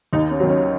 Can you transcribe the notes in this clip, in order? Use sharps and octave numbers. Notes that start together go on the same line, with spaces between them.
D#2 D#4
C#4
D#3 F#3
C#4